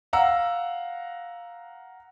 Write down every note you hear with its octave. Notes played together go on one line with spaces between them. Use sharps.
F5 F#5 A#5 E6